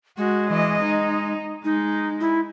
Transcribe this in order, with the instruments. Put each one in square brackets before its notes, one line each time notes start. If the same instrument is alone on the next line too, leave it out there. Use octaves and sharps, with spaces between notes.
[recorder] G#3 [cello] F#4
[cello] E3 D#5
D#4
[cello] G#3 [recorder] D#4
[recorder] E4